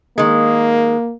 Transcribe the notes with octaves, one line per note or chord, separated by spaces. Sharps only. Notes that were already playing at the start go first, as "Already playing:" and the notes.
D#3 G#3 A#3